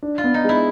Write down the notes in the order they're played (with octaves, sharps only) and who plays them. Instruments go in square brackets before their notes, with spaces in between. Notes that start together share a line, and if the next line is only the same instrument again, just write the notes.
[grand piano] D4
[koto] F4
[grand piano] B3
[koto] D#4
[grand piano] G#3 [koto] E4